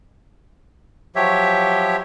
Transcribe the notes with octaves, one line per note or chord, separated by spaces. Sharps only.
F3 F#3 G4 C#5 E5